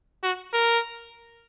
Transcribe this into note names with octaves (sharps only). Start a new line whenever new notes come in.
F#4
A#4